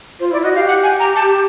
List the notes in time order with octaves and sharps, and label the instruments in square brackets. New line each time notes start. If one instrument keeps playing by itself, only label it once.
[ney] F4 [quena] C5
[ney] E4 [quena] D5
[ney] F#4 [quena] D#5
[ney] G4 [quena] F5
[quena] F#5
G#5
A#5
A5